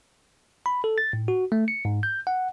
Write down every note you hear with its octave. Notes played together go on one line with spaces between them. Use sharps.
B5
A4
A6
A2
F#4
A3
C#7
G#2
G6
F#5